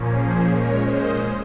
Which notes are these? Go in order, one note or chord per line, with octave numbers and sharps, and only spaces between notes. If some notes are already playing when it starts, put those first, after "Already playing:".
Already playing: A#2 F3 A#3 C#4
G#4 C5
A#2 G#3 C#4 A#4 C#5
C5 D#5